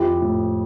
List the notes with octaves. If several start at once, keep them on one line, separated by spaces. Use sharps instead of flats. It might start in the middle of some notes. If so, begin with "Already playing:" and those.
Already playing: F2 F3 E4 G4
A2